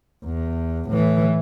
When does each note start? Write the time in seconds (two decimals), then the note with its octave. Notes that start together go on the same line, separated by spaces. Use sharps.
0.24 E2
0.89 A2 E3